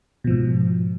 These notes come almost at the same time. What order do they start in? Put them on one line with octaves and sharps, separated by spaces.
B2 F3 G#2